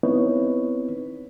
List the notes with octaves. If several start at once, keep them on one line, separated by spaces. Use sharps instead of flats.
B3 C4 D#4 E4 B4 C#5